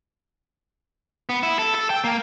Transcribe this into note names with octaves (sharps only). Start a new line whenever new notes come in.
B3
E4
A4
A4
G5
A#3